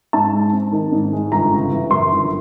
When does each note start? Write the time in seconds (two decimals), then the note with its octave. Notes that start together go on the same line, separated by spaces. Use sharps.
0.13 G#2 A5
0.33 G#3
0.53 C4
0.73 D#3
0.92 G#2
1.13 G#3
1.32 G1 A#5
1.52 C#3
1.71 E3
1.91 F#2 C6
2.12 G1